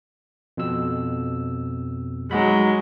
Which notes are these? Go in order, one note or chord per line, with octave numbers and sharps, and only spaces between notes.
F2 B2 E6
F#3 G#3 D#4 F#4 B5